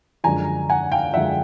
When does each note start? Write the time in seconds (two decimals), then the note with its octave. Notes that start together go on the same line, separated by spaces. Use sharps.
0.24 F#2 D3 F3 G#3 G#5 A#5
0.70 F#5 G#5
0.92 F5 G5
1.14 F#2 D3 F3 G#3 E5 F#5